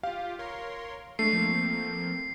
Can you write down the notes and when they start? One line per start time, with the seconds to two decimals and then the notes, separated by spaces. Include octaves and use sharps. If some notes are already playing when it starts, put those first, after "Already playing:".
0.03 F4 G4 F5
0.39 A#4 C#5 C6
1.19 G#3 A3 D4 C7
1.33 F3 A#3 C4